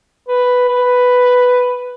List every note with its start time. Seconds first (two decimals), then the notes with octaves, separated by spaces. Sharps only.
0.28 B4
0.69 B4